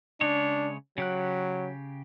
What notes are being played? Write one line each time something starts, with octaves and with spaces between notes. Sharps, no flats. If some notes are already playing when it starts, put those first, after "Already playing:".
C#3 G#3 D4 C#5
C#3 F#3 G4 F#6